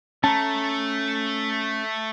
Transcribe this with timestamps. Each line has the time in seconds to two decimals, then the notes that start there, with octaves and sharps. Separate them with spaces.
0.24 A3 C#4 A5 A#5